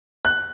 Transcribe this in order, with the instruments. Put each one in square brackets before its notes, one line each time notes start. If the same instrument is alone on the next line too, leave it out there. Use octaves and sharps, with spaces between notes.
[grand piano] F#6